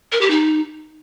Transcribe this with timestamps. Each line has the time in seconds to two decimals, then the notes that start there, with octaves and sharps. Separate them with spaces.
0.12 A#4
0.21 G4
0.30 D#4